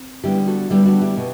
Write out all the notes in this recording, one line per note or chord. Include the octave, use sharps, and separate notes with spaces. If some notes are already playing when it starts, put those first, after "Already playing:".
Already playing: C4
D3 G3 B3 E4 G4
F#4 A4
D3 G3 B3 E4 G4
D4 F#4
E4 G4
B2